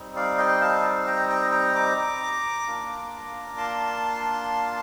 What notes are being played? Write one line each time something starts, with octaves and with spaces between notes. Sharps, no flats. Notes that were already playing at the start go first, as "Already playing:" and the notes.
Already playing: G3 C4 D#4
D5 F5
D#5 G5
F5 A5
G5 A#5
G5 A#5
G5 A#5
A#5 D6
A#3 D4 F4
A5 C6